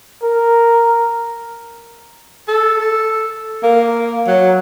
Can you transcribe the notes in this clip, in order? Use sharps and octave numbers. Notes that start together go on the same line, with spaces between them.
A#4
A4
A4
A#3
F#3